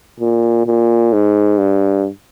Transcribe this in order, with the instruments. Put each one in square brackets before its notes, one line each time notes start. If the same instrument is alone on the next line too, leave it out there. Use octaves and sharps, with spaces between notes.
[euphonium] A#2
A#2
G#2
G2